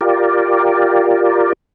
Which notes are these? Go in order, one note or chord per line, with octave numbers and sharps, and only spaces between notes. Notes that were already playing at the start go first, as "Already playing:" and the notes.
F4 G4 A#4 D5